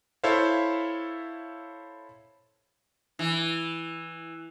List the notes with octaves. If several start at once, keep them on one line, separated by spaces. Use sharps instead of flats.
E4 A4 C5 C#5 E5 F5
E3